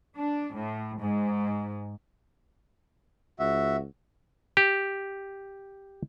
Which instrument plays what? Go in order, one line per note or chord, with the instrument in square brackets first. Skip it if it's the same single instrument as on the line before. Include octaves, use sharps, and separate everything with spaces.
[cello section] D4
A2
G#2
[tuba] C#2 [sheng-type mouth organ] F#4 E5
[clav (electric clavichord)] G4